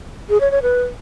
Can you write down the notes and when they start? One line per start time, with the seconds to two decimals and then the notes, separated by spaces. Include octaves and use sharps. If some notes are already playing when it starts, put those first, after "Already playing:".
0.30 G#4
0.40 C#5
0.51 C#5
0.62 B4